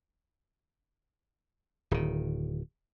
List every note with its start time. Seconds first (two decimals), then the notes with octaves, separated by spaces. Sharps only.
1.91 D1 D#3